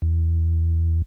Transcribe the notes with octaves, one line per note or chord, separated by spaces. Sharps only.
E2